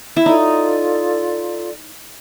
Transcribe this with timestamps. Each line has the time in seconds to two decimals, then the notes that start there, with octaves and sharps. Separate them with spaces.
0.16 E4
0.26 D#4 F4 A4 D5